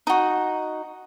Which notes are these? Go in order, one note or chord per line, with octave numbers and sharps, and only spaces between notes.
D#4 F#4